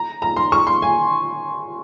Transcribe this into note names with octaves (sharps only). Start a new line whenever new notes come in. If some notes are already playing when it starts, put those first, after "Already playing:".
Already playing: A#5
A#5
C6
C#6
C6
G#5